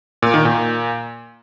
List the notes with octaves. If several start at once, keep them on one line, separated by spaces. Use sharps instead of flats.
A#2
D#3
A#2